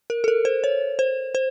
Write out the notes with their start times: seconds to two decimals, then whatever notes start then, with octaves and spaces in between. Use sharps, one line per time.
0.10 A#4
0.24 A4
0.28 A#4
0.45 C5
0.64 C#5
0.99 C5
1.35 C5